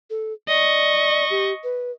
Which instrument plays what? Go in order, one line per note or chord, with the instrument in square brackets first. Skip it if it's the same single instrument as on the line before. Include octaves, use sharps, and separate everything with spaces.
[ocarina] A4
[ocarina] D5 [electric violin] D#5 C#6
[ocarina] G4
B4